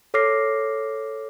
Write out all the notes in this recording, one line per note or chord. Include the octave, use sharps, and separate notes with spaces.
A4 C#5 D6 F6 A#6 C7